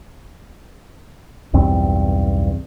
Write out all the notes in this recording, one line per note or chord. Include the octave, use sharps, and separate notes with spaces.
B1 E2 G2 C4